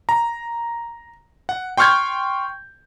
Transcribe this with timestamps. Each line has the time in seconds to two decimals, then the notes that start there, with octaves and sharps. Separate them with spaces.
0.09 A#5
1.49 F#5
1.77 G5 C6 C#6 F6 G6 G#6